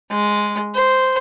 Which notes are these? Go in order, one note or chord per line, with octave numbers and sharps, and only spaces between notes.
G#3
C5